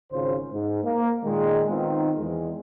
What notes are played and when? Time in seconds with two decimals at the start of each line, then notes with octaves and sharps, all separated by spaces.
0.12 G#1 C#3 F4 C5
0.52 G#2
0.84 A#3
1.24 A#2 D#3 G#3
1.69 D#3 B3 C4 D#4 F4
2.18 E2 G#3